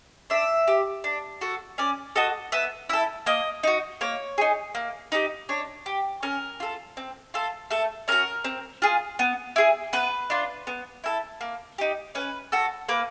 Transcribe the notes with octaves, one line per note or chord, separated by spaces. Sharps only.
D4 E5
G4
D4
F#4 A4
C#4 D5
F#4 A4 D#5
B3 E5
E4 A4 E5
A#3 D#5
D#4 F#4
A#3 C#5
D#4 G#4
A#3
D#4 G4
D4 C#5
G4
C#4 A#4
F4 A4
C4
F4 A4
A3 A4
C#4 F#4 A#4
C4
F4 G#4
B3
E4 G#4
B3 B4
D4 F4
B3
E4 A4
A#3
D#4 G4
C#4 B4
F#4 A4
A#3 B4